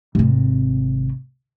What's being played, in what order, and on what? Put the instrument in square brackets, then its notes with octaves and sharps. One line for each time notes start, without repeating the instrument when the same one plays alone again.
[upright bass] G#1 C3